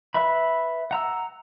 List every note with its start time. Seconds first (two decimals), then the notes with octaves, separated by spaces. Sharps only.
0.14 B4 E5 B5
0.91 F#5 A#5 E6